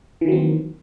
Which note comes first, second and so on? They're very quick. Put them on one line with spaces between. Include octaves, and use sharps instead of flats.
E3 D#3 F#3 C4 A#3